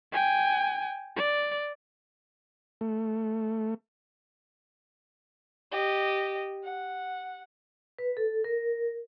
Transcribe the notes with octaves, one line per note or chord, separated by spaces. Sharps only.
G5 G#5
D5
A3
G4 D#5
F#5
B4
A4
A#4